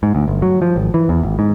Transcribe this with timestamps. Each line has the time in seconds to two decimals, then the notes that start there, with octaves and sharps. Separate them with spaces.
0.03 G#2
0.15 D2
0.28 G1
0.42 F#3
0.62 F3
0.76 G#1
0.94 E3
1.09 E2
1.23 G#1
1.39 G#2